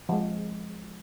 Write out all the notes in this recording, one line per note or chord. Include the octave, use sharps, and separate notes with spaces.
F3 G#3